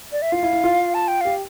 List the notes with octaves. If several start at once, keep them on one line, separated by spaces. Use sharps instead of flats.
D5
E5
F4 F5
E4
E4
F4
A5
G5
G4 F5